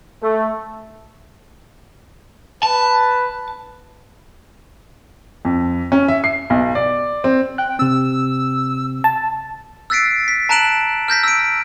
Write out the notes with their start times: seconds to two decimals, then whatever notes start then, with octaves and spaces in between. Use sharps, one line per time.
0.22 A3
2.63 B4 A5
5.45 F2
5.92 C#4
6.08 E5
6.24 C7
6.50 B1
6.75 D5
7.24 C4
7.58 G5 F#6
7.79 C3 C4 E6
9.04 A5
9.90 E6 F#6 A6 B6 C7 D7
10.28 B6
10.49 A5 A#5 F#6 D7 E7 F#7
11.08 F6 G6 A#6 B6
11.23 E6 D7